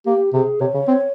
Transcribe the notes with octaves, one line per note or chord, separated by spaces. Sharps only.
A#3 G4
C3 G#4
C3 C#5
C#3
C4